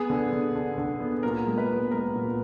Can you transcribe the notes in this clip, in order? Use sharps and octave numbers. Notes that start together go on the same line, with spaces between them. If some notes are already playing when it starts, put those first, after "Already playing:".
Already playing: B3 G#4
D3
D3
D3
D3
B3
A#2 A#4
G#3
B4
B3
G#3 A#4
A#2